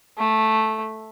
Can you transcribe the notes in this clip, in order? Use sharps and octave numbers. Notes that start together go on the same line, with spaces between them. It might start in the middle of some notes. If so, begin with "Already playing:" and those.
A3